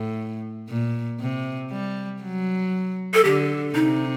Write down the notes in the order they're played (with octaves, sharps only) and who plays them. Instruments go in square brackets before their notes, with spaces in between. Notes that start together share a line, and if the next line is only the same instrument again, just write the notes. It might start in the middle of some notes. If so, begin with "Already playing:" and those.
Already playing: [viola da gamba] A2
A#2
C3
G3
F#3
[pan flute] A4
[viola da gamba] D3 [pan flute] G4
[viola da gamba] C3 [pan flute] D#4